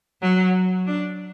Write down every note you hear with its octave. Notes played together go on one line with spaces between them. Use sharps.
F#3
D4